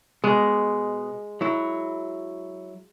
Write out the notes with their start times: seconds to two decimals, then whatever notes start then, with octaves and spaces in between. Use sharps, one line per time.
0.24 B2 G#3
1.41 F#3 E4